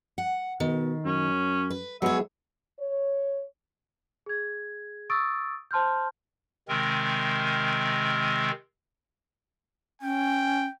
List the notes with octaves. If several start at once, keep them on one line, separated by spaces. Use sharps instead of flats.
F#5
B2 D#3
F#2 C#4
B4
F#3 G#3 B3 G#4 C#5 E5
C#5
G#4 G#6
C#6 D#6 E6 A6 D7
C5 A5 C6 F6 G6
C3 D#3 G#3 C4 A#4
C#4 G5